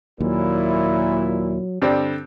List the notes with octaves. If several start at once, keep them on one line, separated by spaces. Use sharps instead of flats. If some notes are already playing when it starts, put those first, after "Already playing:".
D#2 A#2 F#3 E4
G2 D3 G3 C4